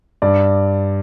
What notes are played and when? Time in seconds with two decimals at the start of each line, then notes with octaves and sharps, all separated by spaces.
0.22 G2 D5